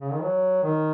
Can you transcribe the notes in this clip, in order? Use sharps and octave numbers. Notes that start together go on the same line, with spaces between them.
C#3
D#3
F#3
D#3